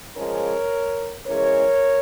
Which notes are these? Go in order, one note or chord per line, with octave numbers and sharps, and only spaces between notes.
C#3 F3 G#3 C#4 A#4 C#5
C#3 E3 G#3 A#4 C#5